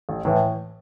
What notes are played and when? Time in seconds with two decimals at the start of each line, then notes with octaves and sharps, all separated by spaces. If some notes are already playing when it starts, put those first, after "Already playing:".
0.09 A1
0.25 A2 E3